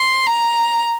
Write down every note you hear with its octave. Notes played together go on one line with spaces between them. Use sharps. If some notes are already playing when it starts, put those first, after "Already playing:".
Already playing: C6
A#5